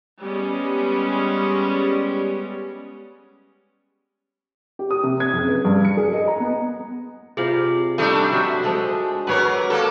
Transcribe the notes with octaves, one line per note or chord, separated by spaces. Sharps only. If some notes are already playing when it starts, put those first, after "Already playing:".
G3 G#3 B3 C#4
G4
D#6
C3
G#6
F#1
B4
G2
C#7
G#4
D#5
A#5
B3
C3 F4 G#4 D5 F5
G3 A3 D4 D#4 A4 G#5
F#3 F#4 E5
F3 G#3 A4
F#3 A#4 B4 C#5 D5
A#3 A4